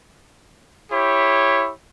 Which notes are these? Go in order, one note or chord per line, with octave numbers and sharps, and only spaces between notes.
E4 G4 C#5